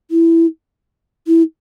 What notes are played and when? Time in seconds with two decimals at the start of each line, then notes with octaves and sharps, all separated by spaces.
0.11 E4
1.27 E4